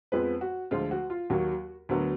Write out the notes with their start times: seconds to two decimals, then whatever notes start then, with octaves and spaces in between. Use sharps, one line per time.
0.12 F2 F3 G#3 B3 B4
0.41 F#4
0.71 D2 D3 F3 G#3 F4
0.91 F#4
1.10 F4
1.30 D#2 D#3 F#3 A#3 F#4
1.89 D2 D3 F#3 B3 A#4